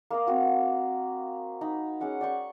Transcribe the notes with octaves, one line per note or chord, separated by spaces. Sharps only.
A#3 D#5 F5 A#5
C4 F#4 F5
D#4 A#5 B5
G#3 C#4 F#5 D6
D5 G5 C#6